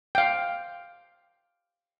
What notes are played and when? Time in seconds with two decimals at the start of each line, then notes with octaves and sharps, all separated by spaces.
0.15 F5 G5